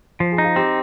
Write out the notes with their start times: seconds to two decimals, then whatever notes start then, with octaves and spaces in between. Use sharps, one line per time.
0.20 F3 C5
0.32 G#4
0.38 D#4
0.44 F4
0.56 C4 G4